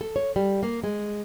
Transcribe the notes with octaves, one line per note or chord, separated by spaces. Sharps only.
A4
C#5
G3
A#3
G#3